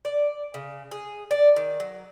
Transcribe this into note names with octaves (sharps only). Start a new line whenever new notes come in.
D5
C#3
G#4
D5
D#3
F#3